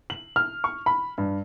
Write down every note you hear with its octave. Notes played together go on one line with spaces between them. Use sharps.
F#7
F6
C#6
B5
G2